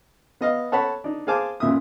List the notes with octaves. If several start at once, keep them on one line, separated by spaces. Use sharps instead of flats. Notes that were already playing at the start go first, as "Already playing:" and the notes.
B3 D#5 F5
A4 C#5 F#5 A5 B5
D4 D#4
G#4 C5 F5 G#5 A5 D6
A1 F#2 A#2 E5 D#6